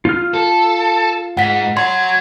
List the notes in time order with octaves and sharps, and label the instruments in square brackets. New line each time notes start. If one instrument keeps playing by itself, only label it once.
[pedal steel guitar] F4 F6
[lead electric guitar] A4
[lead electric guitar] G#2 [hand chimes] F#5 B6
[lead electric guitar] C#5 F#5 [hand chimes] C6 [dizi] G#6